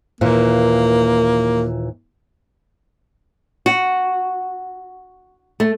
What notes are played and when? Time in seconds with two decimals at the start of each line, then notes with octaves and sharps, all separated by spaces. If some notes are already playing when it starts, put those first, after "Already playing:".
0.21 D#2 A#2 E3 A#3
3.66 F#4
5.60 A3